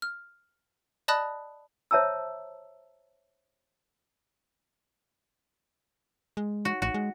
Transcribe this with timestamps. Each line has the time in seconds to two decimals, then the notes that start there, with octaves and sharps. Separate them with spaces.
0.02 F6
1.08 D5 D#5 A5 B5 D#6 F#6
1.91 C5 C#5 E5 A5 A#5 E6
6.37 G#3
6.65 F#4
6.82 A1 F#4
6.94 G#3